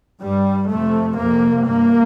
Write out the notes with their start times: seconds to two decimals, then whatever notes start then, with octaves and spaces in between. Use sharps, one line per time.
0.22 G2 G3
0.70 F2 C3 A3
1.17 F2 C3 A#3
1.65 G2 A#3